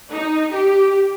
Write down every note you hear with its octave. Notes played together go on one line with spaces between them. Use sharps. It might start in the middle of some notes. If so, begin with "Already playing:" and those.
D#4
G4